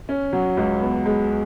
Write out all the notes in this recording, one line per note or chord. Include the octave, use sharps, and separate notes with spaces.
C#4
F#3
C#2
B3
G#3